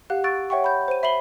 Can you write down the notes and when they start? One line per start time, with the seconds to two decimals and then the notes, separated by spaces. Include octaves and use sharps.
0.10 G4 F5 F#5 F#6
0.24 C#6 E6 F#6 A6 D7
0.50 C#5 E5 F#5 G5 C#6
0.64 B5 G6
0.88 C5 D#7
1.03 E5 B5 C7 F#7 G7